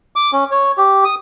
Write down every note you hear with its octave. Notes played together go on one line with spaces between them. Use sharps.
D6
C#4
C#5
G4
D#6